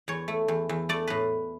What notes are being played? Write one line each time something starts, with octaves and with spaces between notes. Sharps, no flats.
E2 C#5
A3
E2
E2
A3 D5
A2 B4